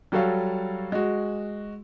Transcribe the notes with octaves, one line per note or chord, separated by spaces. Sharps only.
F#3 G3 F#4 A4 C#5 F5
G#3 F#4